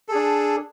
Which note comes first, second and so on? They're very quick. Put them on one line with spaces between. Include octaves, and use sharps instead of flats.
A4 G#4 D4